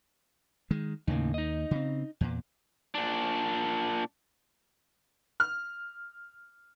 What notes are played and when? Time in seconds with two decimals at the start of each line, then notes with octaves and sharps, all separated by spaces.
0.71 D#3 G#3
1.07 D#2 A2 C#3 A#3 D#4
1.34 D#4 D#5
1.71 C#3 C4
2.21 E2 A#2
2.95 A#2 D4
5.40 F6